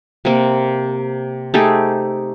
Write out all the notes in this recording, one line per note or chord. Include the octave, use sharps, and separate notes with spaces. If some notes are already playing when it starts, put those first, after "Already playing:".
C3 A#3
A3 D#4 G4 G#4